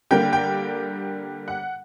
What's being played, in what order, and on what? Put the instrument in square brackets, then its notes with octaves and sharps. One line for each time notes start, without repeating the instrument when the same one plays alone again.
[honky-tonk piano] D3 G3 A#3 G5
G5
F#5